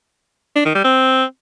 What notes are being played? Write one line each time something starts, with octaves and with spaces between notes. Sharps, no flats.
D4
D#3
G3
C4